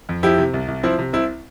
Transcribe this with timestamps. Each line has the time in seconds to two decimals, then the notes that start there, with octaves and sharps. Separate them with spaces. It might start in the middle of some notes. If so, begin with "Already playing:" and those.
0.09 F2
0.23 F3 E4 G4
0.38 C3
0.54 C2
0.68 C2
0.83 F3 C4 E4
0.99 C3
1.13 C2 C4 E4